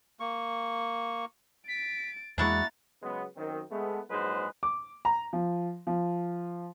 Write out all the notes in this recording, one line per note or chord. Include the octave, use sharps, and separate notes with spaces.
A#3 C#6
A6 B6 D7
E2 G#3 A#3 D4 E4 F#4 A#5 A6
C#3 F#3 G#3 B3
F#2 D#3 C4
G#3 A3 B3
A#1 G#2 F#3 G#3 B4 C5
D6
A#5
F3
F3